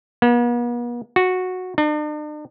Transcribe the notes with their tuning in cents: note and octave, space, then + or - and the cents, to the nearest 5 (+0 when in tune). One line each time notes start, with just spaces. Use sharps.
B3 -45
F#4 -10
D4 +45